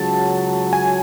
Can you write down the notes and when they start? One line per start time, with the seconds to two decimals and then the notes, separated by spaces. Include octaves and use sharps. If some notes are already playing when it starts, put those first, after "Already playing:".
Already playing: C#2 C#3 F#3 A5
0.73 G#5